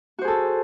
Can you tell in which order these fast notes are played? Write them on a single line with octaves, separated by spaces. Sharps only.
F#4 C5 G#4 A4